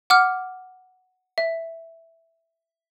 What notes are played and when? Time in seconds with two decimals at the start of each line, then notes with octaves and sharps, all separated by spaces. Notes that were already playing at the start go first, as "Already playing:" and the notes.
0.10 F#5 D6 F6
1.38 E5